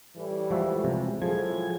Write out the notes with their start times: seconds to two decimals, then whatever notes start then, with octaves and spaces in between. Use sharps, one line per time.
0.17 A2 E3 G3
0.50 F3 G#3 F#4 E5
0.84 C3
1.22 A2 F3 F#3 G#3 G#4 G#6